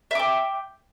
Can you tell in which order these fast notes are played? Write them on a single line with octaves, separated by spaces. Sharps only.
E5 D6 G5